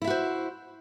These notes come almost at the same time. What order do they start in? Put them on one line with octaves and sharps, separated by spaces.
E4 E5 F#4 C5